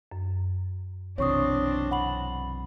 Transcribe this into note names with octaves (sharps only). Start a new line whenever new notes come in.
F#2
B1 C3 E3 C4 D4 C#5 C#6 D#6
F#5 B5 F#7